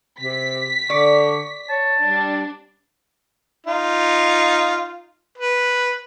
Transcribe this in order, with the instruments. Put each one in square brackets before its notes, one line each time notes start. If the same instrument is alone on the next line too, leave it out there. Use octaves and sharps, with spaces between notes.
[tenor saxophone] C3 [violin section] B6
[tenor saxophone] D3 [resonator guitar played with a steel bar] D5 [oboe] C#6
[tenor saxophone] C#5 [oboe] A5
[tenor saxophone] G3 [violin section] D4
[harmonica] D#4 F4
B4